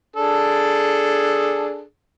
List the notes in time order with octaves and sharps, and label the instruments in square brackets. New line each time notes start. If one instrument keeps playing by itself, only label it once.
[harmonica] D4 G#4 A4